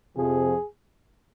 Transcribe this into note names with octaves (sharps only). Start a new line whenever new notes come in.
F2 C3 F3 G#4